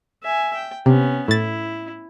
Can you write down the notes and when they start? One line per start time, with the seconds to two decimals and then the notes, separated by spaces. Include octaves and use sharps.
0.23 E5 G#5
0.55 G5
0.86 C3 B3 C#4
1.28 A2 E4 A6